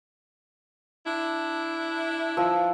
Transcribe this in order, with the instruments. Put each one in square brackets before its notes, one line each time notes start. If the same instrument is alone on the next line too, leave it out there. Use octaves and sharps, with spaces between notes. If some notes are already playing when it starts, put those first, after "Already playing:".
[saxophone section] D4 E4
[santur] F3 E6